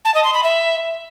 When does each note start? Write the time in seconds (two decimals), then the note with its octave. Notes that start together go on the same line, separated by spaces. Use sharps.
0.05 A5
0.15 D#5
0.24 C6
0.34 B5
0.43 E5